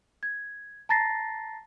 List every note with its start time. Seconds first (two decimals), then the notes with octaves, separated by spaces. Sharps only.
0.23 G#6
0.89 A5 A#5 A6 A#6 C7